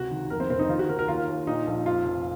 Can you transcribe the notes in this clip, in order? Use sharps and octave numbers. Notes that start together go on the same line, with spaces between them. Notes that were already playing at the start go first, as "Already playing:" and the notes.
Already playing: C#2 C3 F#4
D#3
F1 A#4
C4
F1 C4
D#4
D#3 F4
F#4
D#3 A#4
A#4
D#2 F4
D#2
A#2 D#4
A#1
F2 F4
F1